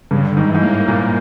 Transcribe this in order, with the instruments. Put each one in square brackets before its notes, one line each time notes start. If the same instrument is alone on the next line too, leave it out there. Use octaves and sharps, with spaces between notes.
[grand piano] G2 [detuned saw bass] C#3
[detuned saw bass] D3
[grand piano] G#2 [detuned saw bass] D#3
[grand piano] G#2 [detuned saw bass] E3
[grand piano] A2 [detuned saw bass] A#3
[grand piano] A#2